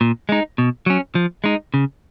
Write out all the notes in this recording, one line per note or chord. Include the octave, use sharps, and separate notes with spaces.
A#2
G#3 D#4
B2
F#3 C#4
F3
G#3 D#4
C#3